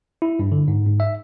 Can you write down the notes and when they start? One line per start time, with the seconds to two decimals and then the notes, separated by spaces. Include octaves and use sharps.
0.22 E4
0.39 G2
0.52 D3
0.68 G#2
0.87 G#2
1.00 E5